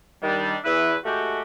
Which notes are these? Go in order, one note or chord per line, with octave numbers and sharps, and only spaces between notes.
D#3 G3 D4
E2 E4 B4
G#3 A3 F#4 G4